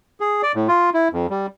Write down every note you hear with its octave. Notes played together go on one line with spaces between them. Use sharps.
G#4
D5
A2
F4
E4
F2
G3